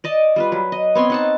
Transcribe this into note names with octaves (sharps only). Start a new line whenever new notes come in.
D5 D#5 A5
G3 F4 B4
F#3
D#5
B3 C4 C#5 C6
D#4 F#5 A5